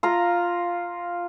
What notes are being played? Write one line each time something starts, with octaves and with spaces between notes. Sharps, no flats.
F4 F5 A#5